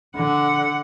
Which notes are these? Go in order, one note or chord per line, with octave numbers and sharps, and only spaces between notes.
D3 F#5